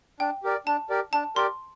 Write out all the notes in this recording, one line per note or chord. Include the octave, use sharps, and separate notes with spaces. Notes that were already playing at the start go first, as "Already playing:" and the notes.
D4 G5
G4 A#4 D5
D4 A5
G4 A#4 D5
D4 A5
G4 A#4 D5 C6